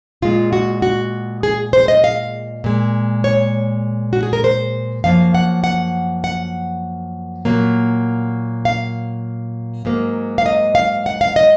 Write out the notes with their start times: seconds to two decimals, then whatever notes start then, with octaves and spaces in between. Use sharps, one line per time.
0.22 A#2 G#3 F4
0.53 F#4
0.82 F#4
1.43 G#4
1.73 C5
1.88 D#5
2.04 F5
2.64 A#2 G#3
3.24 C#5
4.13 F#4
4.23 G#4
4.33 A#4
4.44 C5
5.04 F#2 F3 A#3 F5
5.35 F#5
5.64 F#5
6.24 F#5
7.45 A#2 F#3 A#3
8.65 F5
9.85 G#2 F#3 A#3
10.38 F5
10.46 D#5
10.75 F5
11.06 F#5
11.21 F5
11.36 D#5